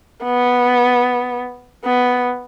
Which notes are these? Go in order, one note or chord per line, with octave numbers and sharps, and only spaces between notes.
B3
B3